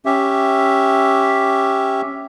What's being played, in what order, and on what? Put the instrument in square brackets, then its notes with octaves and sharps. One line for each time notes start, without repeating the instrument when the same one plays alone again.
[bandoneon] C#4 G4 E5